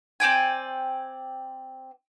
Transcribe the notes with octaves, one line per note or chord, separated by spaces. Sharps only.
C4 D5 G5 G#5